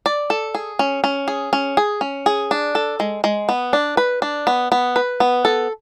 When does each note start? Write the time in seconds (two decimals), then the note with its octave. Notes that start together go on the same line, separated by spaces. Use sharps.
0.06 D5
0.30 A4
0.55 G#4
0.79 C#4
1.04 C#4
1.28 G#4
1.53 C#4
1.77 G#4
2.01 C#4
2.26 G#4
2.51 D4
2.75 A4
3.00 G#3
3.24 G#3
3.49 B3
3.73 D4
3.97 B4
4.22 D4
4.47 B3
4.72 B3
4.96 B4
5.20 B3
5.45 A4